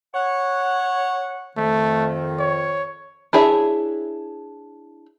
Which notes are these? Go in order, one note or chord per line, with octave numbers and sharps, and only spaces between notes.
C#5 F#5
F2 D#3 A3
C#5
D4 E4 G#4 C#5 E5